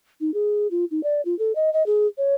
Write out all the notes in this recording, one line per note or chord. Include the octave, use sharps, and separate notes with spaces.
D#4
G#4
F4
D#4
D5
F4
A4
D#5
D#5
G#4
C#5